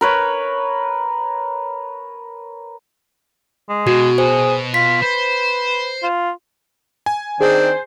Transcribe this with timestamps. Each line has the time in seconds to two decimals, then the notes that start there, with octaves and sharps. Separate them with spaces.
0.01 A#4 B4 C#5
3.69 G#3
3.87 B2 F#4
4.18 G#4 C5
4.74 F4 B6
5.02 B4 C5
6.03 F4
7.06 G#5
7.41 D#3 C4 D4 G#4 C5